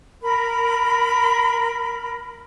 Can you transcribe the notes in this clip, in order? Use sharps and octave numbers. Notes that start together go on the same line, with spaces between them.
A#4 B5